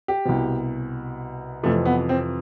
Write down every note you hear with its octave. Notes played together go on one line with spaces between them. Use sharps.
G4
C2 B2
F2 C3 E3 A3
B3
C4